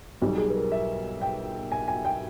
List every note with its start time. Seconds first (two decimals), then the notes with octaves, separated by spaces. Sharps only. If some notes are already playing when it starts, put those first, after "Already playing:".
0.22 B1 B2 G3
0.38 G#4
0.50 B4
0.55 A#4
0.72 E5
1.21 G5
1.72 G#5
1.88 G#5
2.05 G5